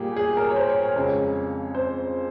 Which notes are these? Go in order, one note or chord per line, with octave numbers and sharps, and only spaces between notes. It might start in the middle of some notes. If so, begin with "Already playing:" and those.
Already playing: A#2 G3 A#3 G4 G#4
G#4
A#4
C#5
C5
C#5
C#5
F2 C#3 G#3
C5